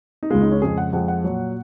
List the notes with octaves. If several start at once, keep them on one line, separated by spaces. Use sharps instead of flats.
D#4
C#2 C#3 G#3 F4
D#4
C#4
F2 C#3 G#3 G#4
F#5
F2 F3 G#3 F#5
F#5
A#2 F#3